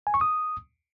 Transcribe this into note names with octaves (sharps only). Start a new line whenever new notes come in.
G#5
C#6
D#6